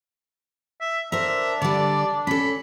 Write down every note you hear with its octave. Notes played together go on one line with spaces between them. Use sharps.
E5
D4 A#4 C5 E5
D3 G3 D5
C#4 A4 B5